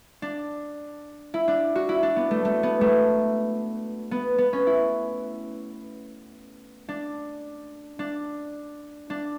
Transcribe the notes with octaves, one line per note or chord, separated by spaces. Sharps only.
D4
E4
D4
F#4
E4
D4
B3
A3
A3
B3
A3
B3
B3
C#4
E4
D4
D4
D4